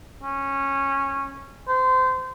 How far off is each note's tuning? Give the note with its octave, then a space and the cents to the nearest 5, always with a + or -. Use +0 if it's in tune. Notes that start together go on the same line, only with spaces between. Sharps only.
C#4 -15
C5 -25